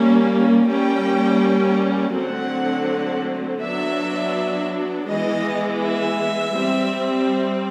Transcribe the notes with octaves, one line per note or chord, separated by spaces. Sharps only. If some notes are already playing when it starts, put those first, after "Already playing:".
Already playing: G3 A#3 C#4
G3 A#3 C#4 G5
D3 F#3 A3 C4 F#5
F#3 B3 D4 E5
E3 G#3 B3 D#5
E5
G3 C4